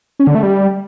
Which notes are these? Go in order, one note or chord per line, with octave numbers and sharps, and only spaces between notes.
C#4
D3
A3
G3